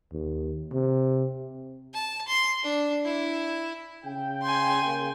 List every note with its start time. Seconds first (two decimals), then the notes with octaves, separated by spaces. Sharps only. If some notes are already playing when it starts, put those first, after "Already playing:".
0.12 D#2
0.73 C3
1.93 A5
2.28 C6
2.63 D4
3.05 E4
4.05 C#3 G5
4.42 G#5 C6
4.83 C#3 A#3 G5